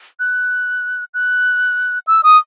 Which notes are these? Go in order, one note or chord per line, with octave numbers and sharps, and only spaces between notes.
F#6
F#6
E6
D#6